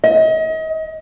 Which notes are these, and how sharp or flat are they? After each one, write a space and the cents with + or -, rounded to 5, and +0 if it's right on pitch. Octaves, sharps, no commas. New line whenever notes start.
D#5 +35